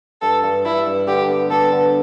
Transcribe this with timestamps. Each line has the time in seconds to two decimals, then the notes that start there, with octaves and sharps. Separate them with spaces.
0.22 G2 A4
0.43 G2
0.65 G3 E4
0.86 G2
1.07 D3 G4
1.29 B3
1.50 B3 A4
1.72 D3